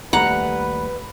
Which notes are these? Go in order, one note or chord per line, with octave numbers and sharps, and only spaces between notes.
D#2 G3 A3 B4 F#5 A#5